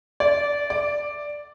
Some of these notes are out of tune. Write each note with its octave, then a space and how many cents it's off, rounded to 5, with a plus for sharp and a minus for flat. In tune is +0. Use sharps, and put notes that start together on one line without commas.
D5 -20
D5 +0